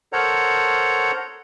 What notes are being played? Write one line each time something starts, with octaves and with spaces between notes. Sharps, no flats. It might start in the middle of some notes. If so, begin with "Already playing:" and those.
A4 A#4 C5 C#5 F#5 A#5